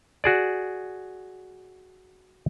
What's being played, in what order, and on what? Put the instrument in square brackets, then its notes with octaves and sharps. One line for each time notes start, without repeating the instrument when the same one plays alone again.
[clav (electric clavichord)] F#4 G#4 D5